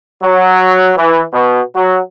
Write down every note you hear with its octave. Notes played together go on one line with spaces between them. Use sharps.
F#3
E3
B2
F#3